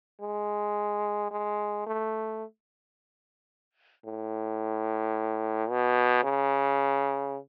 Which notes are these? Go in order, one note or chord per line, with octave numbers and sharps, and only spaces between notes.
G#3
G#3
A3
A2
B2
C#3